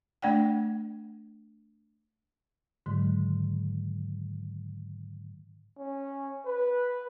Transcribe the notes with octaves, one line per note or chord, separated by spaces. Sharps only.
A3 D4 D5 F#5 G5
G#2 D3 D#3 F#3 G#3
C#4
B4